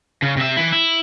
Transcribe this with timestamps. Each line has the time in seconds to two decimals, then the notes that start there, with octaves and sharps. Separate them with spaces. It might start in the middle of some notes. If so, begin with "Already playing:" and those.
0.22 C#3
0.37 C3 E5
0.57 E3 E4
0.73 E4